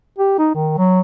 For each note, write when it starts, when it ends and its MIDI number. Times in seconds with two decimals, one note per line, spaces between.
0.19 0.37 67
0.38 0.50 63
0.55 0.76 51
0.78 1.00 54